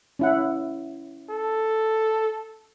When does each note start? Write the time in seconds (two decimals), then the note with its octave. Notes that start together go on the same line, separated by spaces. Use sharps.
0.19 C#4 E4 F#5
1.30 A4